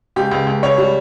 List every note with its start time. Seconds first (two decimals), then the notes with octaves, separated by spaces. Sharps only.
0.16 C#2 G4
0.31 C#2
0.47 C#2
0.63 C#2 C#5
0.78 G3